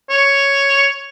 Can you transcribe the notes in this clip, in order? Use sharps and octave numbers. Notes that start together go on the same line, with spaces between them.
C#5